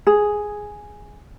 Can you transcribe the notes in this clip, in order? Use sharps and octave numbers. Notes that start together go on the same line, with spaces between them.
G#4